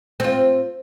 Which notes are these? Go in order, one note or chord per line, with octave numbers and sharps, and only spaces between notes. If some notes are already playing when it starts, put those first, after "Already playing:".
C4 F4